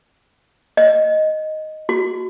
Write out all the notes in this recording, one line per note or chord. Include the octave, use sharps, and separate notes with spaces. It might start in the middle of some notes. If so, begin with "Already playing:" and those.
D#5
F#4